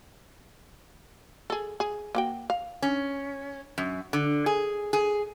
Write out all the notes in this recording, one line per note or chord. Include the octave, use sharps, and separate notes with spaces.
G#4 A4
G#4
A#3 F#4 G5
F5
C#4
F#2
D3
G#4
G#4